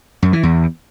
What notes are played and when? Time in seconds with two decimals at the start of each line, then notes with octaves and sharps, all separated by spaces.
0.22 F#2
0.33 E3
0.43 E2